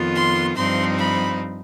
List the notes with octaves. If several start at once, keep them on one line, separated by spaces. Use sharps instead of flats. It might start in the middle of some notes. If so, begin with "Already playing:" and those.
Already playing: F2 D#3 B3 F4
C6
G2 F3 C4 D#4 C6
B5